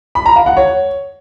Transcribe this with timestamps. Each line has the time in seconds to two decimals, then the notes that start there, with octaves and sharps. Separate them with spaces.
0.15 B5
0.26 A#5
0.36 F5
0.46 F#5
0.57 C#5